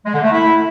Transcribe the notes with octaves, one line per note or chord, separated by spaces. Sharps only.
G#3
D3
A3
E4